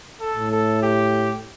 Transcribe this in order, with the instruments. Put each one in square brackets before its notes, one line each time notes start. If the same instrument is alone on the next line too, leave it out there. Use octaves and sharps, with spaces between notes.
[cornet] A4
[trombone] A2
[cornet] A4
G4